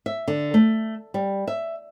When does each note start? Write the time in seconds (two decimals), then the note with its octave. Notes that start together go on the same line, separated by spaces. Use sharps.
0.06 E5
0.28 D3
0.54 A3
1.14 G3
1.48 E5